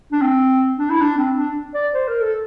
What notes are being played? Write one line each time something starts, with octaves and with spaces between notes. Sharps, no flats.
D4
C4
D4
E4
D4
C4
D4
D5
C5
A#4
A4